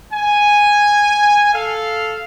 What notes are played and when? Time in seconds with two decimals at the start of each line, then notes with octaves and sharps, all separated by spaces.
0.12 G#5
1.53 A4 F5